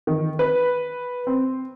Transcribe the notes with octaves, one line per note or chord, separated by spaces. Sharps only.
D#3
B4
C4